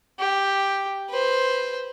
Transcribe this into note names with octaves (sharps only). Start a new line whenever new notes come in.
G4
B4 C5